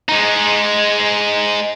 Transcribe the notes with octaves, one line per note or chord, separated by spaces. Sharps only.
G#3 D#4